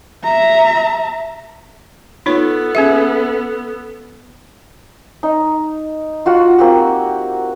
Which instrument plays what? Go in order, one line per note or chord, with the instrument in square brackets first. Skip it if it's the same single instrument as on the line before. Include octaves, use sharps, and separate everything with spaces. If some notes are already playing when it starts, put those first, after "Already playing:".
[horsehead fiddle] E5 A#5
[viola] B3 A4 [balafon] D#4 F4 C#5
[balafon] C#4 G#4 E5
[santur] D#4
F4 F#4 F#5
A#3 C4 F#4 G4